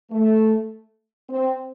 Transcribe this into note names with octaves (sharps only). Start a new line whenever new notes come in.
A3
C4